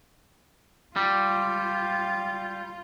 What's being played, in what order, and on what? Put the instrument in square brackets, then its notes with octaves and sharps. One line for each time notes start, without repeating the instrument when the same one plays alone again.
[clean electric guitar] G3 [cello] F4